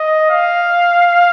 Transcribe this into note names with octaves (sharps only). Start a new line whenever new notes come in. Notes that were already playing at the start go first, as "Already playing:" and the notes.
Already playing: D#5
F5